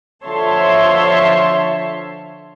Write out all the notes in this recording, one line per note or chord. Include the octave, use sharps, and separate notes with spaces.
D3 F3 C#5 E5 A5 C6